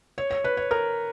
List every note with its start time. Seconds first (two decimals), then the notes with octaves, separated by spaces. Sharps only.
0.18 C#5
0.31 C#5
0.44 B4
0.57 C#5
0.71 A#4